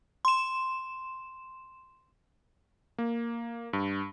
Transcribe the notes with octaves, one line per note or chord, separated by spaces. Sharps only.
C6 E7
A#3
G2